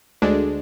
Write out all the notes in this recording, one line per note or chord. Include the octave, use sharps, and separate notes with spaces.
D2 D3 G#3 D4